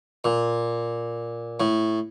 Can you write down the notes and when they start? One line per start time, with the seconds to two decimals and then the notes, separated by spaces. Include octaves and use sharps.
0.24 A#2
1.60 A2